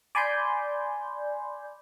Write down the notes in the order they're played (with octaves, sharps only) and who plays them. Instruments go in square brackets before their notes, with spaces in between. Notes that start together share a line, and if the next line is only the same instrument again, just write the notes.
[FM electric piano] D5 G#5 B5 C6 G6